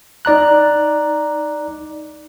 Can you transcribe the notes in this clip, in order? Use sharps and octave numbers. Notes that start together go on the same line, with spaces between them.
D#4 D5 A#5 F#6